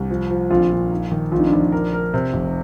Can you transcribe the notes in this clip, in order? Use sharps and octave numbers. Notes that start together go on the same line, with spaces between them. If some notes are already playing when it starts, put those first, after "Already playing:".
Already playing: C2 G4
F3
F3
A#1 F4
A#2
D#4
D#3
A#1 F4
D#4
D4
A#1 D#4
A#4
A#4
C3
F1